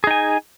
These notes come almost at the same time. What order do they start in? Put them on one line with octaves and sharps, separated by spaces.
G#4 D#4 G#5